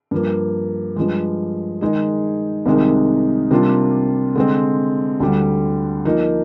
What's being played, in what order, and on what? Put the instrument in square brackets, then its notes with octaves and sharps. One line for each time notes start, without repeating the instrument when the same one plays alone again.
[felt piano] G2 F3 A#3
G2 F3 G#3
D#3 G#3 D#4 G#4
C2 C3 D#3 G#3 D#4
C3 G3 A#3 D4 F4
D3 G#3 C4
D2 D3 G3
F3 A#3 D#4